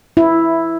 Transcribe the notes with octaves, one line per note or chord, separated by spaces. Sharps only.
E4